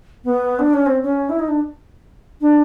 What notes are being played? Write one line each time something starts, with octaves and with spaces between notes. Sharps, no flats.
B3
D4
C#4
C4
C#4
E4
D#4
D4
D4